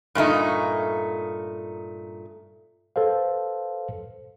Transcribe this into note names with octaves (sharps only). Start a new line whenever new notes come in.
G2 A#2 A3 D#4
A4 B4 C5 F5